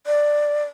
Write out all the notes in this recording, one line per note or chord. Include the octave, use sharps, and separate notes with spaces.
D5